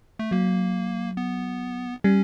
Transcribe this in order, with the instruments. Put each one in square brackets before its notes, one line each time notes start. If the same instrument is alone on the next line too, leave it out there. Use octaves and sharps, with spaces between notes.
[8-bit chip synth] A3
[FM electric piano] F#3 [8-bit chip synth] A#3
[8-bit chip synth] B3
[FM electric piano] G3 [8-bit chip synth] C#4